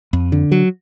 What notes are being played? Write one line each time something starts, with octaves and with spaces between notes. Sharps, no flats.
F2
D3
F#3